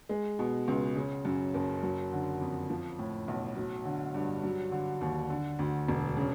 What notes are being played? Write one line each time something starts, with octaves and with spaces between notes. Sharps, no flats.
G#3
B2
C#2
C#3
F#2
F#1
F#3
D3
F2
F3
A2
B1
F#3
D3
G2
F#3
D3
D#2
D3
D2
E1
C#3